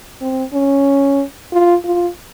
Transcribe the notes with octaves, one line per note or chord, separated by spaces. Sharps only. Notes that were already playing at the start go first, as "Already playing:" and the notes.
C4
C#4
F4
F4